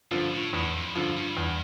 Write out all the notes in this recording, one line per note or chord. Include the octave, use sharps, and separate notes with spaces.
G2 D3 F3
A2
E2 A2
F2
G2 D3 F3
G2
E2